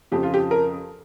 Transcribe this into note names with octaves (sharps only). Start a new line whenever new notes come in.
F2 C#3 F3 G4
F4
G4
A#4